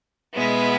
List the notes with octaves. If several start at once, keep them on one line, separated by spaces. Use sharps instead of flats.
B2 G#3 B3 E4